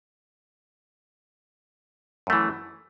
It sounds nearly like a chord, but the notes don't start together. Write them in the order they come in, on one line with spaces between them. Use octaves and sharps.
F#2 A3 E3